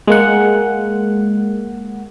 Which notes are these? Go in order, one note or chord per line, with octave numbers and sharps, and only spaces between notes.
G#3 A#3 F#5